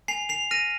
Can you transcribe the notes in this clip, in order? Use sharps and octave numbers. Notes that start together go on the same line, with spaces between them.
G#5 C7 F7
C7 F7
F6 A#6 D#7